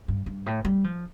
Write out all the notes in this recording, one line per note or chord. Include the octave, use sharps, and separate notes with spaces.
G2
G2
A2
G3
F3